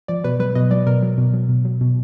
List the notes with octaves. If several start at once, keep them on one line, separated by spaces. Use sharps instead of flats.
F3 D5
B2 B4
F#3 B4
B2 D#5
F#3 D5
B2 A#4
F#3
B2
F#3
B2
F#3
B2